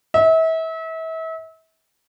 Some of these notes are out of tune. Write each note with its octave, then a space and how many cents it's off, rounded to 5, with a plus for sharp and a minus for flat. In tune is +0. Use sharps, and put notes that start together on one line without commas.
E5 -35